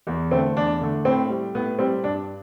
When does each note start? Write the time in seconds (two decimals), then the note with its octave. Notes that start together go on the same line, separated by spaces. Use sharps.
0.07 E2
0.31 D3 A3 C4
0.56 E2 D4
0.81 D3 A3
1.05 A2 C4
1.29 G3
1.54 A2 B3
1.79 G3 C4
2.04 G2 D4